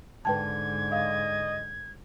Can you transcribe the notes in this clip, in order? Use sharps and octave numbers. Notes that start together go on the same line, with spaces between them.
G#2 D3 B4 G5 A5 G#6
D#5 F5